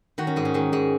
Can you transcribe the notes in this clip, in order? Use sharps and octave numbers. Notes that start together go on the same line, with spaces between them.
D#3 F#4
C#4
G#2 G#3
C#4
D#3 G#3
G#2 G#3